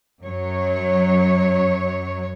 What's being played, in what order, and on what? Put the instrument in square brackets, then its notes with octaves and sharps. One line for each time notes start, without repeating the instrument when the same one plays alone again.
[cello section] F#2 F#3 C#5